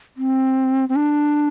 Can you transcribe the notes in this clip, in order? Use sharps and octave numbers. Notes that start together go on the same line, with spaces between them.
C4
C4
D4